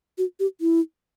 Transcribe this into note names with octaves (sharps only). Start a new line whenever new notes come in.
F#4
G4
E4